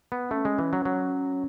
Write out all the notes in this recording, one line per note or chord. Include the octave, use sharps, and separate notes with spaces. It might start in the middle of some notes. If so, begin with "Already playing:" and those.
B3
A3 C#4
G#3
E3
F#3
F#3